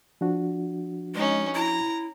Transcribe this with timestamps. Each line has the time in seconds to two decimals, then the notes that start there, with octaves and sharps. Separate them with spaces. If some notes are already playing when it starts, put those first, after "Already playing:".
0.21 F3 D4 F#4
1.15 G#3 C#4 D#4
1.55 E4 A#5